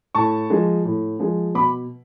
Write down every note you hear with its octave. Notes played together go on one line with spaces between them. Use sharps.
A2 A5 C#6
F3 G#3
A2
F3 G#3
B2 B5 D6